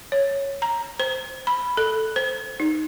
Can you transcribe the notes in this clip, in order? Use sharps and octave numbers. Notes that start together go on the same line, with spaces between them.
C#5
A#5
C5
B5
A4
C5
D#4